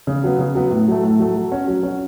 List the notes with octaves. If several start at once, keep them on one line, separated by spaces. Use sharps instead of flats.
C#3
F#3 B3
C#3
F#3 B3
A2
F#3 A3
A2
F#3 A3
F#3
C#4 F#4
F#3
C#4 F#4